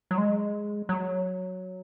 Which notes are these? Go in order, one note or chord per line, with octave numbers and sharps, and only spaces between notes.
F#3
G#3
F#3